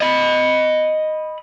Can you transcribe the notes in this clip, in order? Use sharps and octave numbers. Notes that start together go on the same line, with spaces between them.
D#5 B5